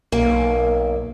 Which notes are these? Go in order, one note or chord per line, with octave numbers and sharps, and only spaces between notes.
B1 A#3